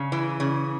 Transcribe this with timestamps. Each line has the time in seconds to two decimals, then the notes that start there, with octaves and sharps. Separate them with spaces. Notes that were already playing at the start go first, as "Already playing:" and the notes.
Already playing: C#3
0.12 E3
0.40 C#3